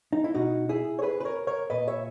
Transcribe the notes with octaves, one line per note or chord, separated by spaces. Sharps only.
D#4
E4
B2 D#4 F#4
E4 G#4
C#5
G#4 B4
B4
A#4 C#5
A#4 C#5
A#2 B4 D#5
C#5 E5